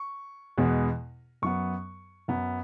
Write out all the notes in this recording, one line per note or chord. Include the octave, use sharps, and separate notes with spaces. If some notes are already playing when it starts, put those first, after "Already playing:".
Already playing: C#6
E2 B2 G#3 B3
F#2 F#3 B3 C#6
F#2 F#3 B3